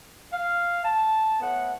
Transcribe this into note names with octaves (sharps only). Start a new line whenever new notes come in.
F5
A5
A2 A3 B3 F#5